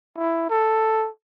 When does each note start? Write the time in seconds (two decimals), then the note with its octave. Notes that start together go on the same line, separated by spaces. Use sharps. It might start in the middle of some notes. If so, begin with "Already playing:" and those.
0.17 E4
0.50 A4